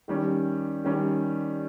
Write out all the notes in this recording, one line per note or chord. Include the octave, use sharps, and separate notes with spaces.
D#3 G3 C#4
D#3 G3 C#4